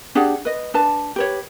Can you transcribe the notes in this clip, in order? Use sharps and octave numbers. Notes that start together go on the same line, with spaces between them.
D4 G4 G#4 F#5
B4 D#5
D4 B4 A5
G4 B4 C#5